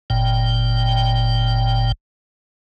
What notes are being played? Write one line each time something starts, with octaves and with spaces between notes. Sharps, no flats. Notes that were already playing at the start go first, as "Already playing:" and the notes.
G1 A#2 G5